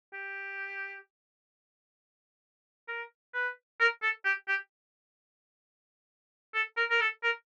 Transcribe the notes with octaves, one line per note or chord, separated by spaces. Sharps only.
G4
A#4
B4
A#4
A4
G4
G4
A4
A#4
A#4
A4
A#4